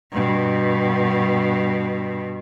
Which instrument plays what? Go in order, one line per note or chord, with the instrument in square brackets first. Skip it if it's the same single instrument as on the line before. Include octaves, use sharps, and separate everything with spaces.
[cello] G2 B2